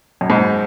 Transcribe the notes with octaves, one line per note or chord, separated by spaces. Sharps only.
F#2
G#2